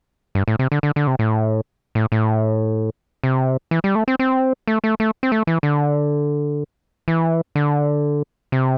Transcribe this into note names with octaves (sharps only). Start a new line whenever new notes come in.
G2
A2
C3
D3
D3
D3
C3
A2
A2
A2
C3
E3
G3
A3
C4
C4
A3
A3
A3
C4
A3
E3
D3
E3
D3
C3